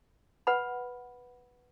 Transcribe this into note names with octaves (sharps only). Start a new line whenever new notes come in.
B4 F#5 B5